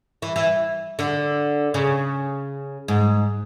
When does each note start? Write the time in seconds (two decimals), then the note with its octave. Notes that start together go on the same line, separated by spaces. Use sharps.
0.22 E3
0.36 E3
0.99 D3
1.74 C#3
2.88 G#2